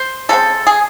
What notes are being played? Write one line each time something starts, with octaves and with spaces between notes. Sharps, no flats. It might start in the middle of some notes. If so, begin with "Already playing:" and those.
Already playing: C5
C#3 G#3 C4 A4
G#4